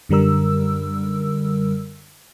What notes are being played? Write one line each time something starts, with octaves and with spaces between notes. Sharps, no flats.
F#2 D3 G3 A#4 E6